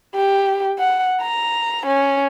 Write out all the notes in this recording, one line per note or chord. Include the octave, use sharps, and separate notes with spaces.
G4
F#5
A#5
C#4